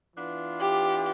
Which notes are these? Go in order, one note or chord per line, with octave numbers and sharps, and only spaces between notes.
E3 B3 D4 F4
G4